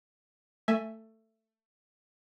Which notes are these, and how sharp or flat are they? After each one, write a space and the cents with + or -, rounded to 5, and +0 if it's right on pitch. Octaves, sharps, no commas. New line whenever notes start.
A3 +15 E5 +0 G#5 +5